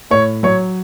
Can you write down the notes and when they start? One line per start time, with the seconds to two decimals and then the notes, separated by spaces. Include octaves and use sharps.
0.11 A2 C#5
0.43 F#3 C#5